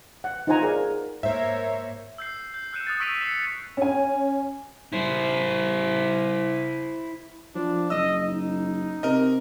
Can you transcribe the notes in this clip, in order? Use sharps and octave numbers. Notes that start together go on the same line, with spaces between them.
F#5
D#4 F4 C5 F#5 G#5 A#5
G#4 A#4 D5 F5
G#2 A#3 A#4 C5 C#5 E5
E6 G6 C7
G6
E6 F#6 G6 C#7 D#7 E7
D#6 F#6 A6 C7
C#6 E6 B6 D7 D#7 F7
E6 C7 C#7 E7
C#4 G#5
E4 C5
F3 D4
F#1 D#5 E6
D#4
C3 A#4 D#5